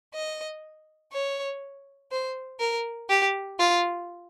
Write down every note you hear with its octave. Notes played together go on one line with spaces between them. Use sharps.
D#5
C#5
C5
A#4
G4
F4